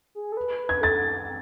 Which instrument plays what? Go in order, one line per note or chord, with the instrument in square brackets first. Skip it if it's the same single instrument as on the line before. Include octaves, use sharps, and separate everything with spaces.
[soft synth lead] G#4
A4
B4
B4
[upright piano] G#6
[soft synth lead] A4 [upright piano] A6